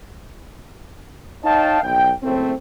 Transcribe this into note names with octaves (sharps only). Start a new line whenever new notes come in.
D#4 C#5 D#5 F5 G5 A5
B1 G5
F#1 A2 A3 C4